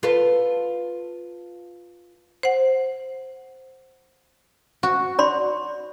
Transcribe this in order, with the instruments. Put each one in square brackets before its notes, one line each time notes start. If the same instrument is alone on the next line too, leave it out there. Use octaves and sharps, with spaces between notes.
[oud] F4 A4 B4
[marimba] C5 F#5
[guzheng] F#4
[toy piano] D5 B5 C6